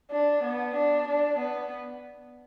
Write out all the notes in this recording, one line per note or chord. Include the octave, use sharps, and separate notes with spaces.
D4
B3
D4
D4
B3